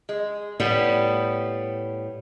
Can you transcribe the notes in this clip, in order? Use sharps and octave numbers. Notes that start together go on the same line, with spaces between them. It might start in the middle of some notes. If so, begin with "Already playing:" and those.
G#3
A2 G3 B3